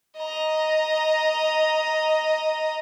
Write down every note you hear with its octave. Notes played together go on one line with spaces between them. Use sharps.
D#5 A#5